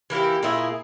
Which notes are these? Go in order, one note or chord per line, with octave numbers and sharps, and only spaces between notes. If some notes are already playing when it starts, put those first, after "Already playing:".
E3 A#3 E4 G4
A#2 A#3 E4 G#4